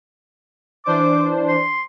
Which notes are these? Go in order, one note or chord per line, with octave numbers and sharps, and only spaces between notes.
E3 D4 C5 D6
C6